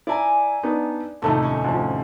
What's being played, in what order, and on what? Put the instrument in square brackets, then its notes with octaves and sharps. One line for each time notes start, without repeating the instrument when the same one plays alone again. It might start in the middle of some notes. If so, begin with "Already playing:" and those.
[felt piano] E4 A#5 [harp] D5 G#5
[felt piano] B3 D4 D#4
[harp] F1 D#2 A2 [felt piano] A#1 A3 D#4
[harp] C#4
[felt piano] D2 F3